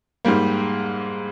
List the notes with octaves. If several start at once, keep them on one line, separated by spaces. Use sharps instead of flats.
G#2 G3 A#3